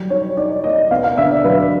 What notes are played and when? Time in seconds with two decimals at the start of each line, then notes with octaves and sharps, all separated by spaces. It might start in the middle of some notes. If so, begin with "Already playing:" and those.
Already playing: F#3 G3
0.10 D#4 C#5
0.37 D#4 D5
0.64 A#3 D#5
0.91 B3 F5
1.04 F5
1.18 D3 E5
1.31 D5
1.44 F#3 B4